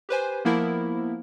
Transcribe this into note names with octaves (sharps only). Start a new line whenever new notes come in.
G4 B4 C5 G#5
F3 A#3 B3 E4 A#4